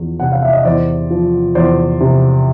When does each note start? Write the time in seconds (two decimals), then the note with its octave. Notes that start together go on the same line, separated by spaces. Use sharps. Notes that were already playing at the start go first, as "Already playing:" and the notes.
Already playing: E2 F3
0.20 C3 F#5
0.32 F5
0.43 E5
0.53 D#5
0.65 E2 C5 D5
1.10 F3
1.55 E2 C5 D5
2.00 C3